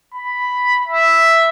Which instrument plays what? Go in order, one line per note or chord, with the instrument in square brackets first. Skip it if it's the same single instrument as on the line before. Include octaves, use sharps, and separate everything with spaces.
[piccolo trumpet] B5
E5